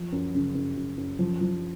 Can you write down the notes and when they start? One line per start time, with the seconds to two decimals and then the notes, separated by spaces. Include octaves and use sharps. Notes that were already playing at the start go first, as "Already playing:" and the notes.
Already playing: F3
0.12 F#2
0.35 C#3
0.55 F#2
0.77 F#2
0.98 F#2
1.19 F3
1.41 F3